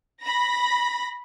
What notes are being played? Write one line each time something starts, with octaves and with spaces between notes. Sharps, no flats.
B5 A#6